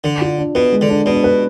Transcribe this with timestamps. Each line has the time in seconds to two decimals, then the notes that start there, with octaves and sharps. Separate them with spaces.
0.04 D3 D4
0.21 F4
0.38 D4
0.55 B2 B4
0.72 G#3
0.81 D3
0.90 D4
1.06 B2 D4
1.24 B4